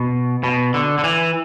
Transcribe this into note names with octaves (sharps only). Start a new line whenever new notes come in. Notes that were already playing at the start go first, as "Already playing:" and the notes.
Already playing: B2
B2
D3
D3
E3